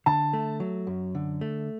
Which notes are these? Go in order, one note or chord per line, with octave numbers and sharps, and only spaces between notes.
D3 A5
A3
F#3
F#2
D3
A3